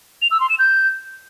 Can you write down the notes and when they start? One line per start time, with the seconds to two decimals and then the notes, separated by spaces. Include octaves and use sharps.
0.22 F7
0.31 E6
0.40 C6
0.50 E7
0.59 G6